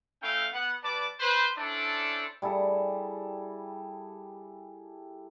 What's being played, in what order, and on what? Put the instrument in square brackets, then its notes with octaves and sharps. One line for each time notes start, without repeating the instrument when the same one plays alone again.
[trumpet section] A3 C#4 E4 F5 G5
B3 F#5
G3 B4 D5 A5 D6
B4 C5
C#4 D4 E4 A4 C5 D5
[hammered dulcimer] G3 E4 G#4 A4